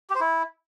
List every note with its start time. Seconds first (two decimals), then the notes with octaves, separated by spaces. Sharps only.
0.10 G4
0.15 C5
0.20 E4